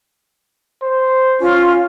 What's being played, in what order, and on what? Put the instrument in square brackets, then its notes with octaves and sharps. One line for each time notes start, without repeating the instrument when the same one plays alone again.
[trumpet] C5
[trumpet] C#4 [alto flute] F4